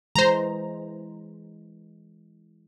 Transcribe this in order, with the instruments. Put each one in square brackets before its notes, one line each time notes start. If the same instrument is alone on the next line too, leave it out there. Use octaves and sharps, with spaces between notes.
[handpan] E3 G#3 [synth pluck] C5 A#5